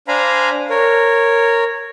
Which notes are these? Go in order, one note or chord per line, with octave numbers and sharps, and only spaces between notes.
D4 C5 F5 G#5 A#5 B5
A#4 C#5